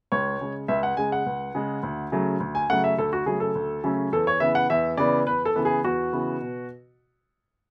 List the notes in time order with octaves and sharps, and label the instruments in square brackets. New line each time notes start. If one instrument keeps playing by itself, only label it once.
[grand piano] C#2 C#5
C#3 G#3
C#2 E5
F#5
C#3 G#3 G#5
F#5
C#2
C#3 G#3
D2
C#3 F#3 A3 C#4
D2
G#5
C#3 F#3 A3 C#4 F#5
E5
D2 A4
F#4
C#3 F#3 A3 C#4 G#4
A4
D2
C#3 F#3 A3 C#4
E2 A4
C#5
C#3 E3 B3 E5
F#5
E2 E5
C#3 E3 B3 D5
E2 B4
A4
C#3 E3 B3
G#4
E2 F#4
C#3 E3 B3
B2